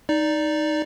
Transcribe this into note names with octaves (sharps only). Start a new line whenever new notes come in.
D#4 D5